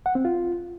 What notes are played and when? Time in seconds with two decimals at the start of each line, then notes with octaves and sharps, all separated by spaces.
0.06 F#5
0.15 C4
0.25 F4